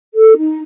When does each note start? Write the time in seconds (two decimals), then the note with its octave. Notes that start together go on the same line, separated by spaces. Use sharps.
0.14 A4
0.37 D#4